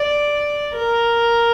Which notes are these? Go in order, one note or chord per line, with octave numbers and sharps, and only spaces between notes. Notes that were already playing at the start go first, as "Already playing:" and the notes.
Already playing: D5
A#4